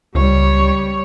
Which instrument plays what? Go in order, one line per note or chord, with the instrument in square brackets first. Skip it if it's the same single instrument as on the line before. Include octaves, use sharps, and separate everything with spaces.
[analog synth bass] C#2 [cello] G3 C#5